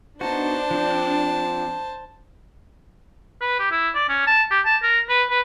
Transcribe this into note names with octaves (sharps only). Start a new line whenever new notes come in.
B3 D4 D#4 F#4 C5 A5
F3 C4
B4
G4
E4
D5
C#4
A5
G4
A5
A#4
B4
B4